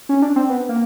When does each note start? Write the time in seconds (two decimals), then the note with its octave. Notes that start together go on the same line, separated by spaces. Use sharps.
0.09 C#4
0.22 D4
0.36 C4
0.49 B3
0.69 A#3